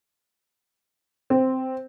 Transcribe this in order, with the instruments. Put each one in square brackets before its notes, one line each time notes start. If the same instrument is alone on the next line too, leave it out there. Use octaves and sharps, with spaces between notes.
[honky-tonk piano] C4